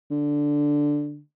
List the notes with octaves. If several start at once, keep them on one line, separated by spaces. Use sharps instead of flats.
D3